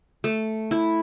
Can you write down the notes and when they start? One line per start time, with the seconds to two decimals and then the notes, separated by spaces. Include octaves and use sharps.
0.24 A3
0.71 E4